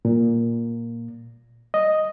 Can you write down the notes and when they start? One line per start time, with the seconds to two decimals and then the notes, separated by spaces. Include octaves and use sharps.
0.05 A#2
1.74 D#5